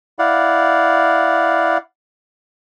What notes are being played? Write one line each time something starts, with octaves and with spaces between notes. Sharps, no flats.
E4 D5 F5 F#5